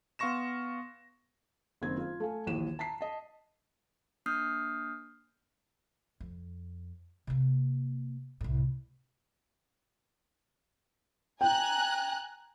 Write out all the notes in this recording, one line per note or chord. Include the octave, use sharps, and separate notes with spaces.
B3 F5 C6 C#6 A#6 E7
F#1 D#3 C4 G#6
F4
A3 F5 G#5
A#1 D#2 E3 D#7 E7
A5 A#5 B6 C7
D#5 A5
A#3 D4 D#6 F6 G6 C7
F2
C3 A#3
C2 A2
G5 G#5 A#5 F#6